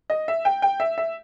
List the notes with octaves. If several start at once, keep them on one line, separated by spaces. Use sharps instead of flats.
D#5
E5
G5
G5
E5
E5